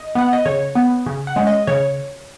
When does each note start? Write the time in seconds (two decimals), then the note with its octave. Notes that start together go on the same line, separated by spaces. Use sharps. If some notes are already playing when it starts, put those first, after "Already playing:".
Already playing: D#5
0.15 B3 F#5
0.33 D#5
0.45 C#3 C#5
0.75 B3
1.06 C#3
1.27 F#5
1.36 G#3 C#4
1.47 D#5
1.67 C#3 C#5